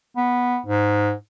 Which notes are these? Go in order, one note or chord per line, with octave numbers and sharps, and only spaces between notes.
B3
G#2